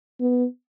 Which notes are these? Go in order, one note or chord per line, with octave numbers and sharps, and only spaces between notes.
B3